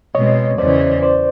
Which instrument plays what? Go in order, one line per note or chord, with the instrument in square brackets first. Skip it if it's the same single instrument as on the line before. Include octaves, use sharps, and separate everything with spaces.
[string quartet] B2 G#3 C4 [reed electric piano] C#5 D#5
[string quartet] E2 C#3 E3 [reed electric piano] C5 D5
[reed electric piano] C5 D5